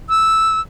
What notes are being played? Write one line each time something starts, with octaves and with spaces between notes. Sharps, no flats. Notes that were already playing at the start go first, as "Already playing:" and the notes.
E6